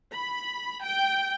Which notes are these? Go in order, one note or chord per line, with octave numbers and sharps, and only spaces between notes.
B5
G5